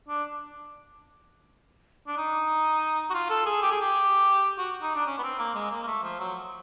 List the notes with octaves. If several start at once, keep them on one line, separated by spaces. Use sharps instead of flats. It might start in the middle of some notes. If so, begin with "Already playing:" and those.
D4
D4
D#4
F#4
F4
A4
G#4
G4
G#4
G4
F#4
D#4
D4
C#4
B3
C4
A#3
G#3
A#3
A#3
A3
F3
F#3